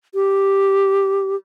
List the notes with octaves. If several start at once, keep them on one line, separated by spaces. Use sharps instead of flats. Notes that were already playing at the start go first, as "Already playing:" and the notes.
G4